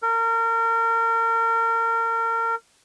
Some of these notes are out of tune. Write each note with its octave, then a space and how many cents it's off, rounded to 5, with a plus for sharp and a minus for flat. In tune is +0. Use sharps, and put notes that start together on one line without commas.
A#4 -30